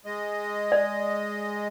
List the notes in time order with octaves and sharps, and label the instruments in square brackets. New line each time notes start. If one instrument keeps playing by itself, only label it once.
[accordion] G#3 D#5
[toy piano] D5